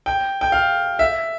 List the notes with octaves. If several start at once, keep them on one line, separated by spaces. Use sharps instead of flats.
G5
G5
F5
E5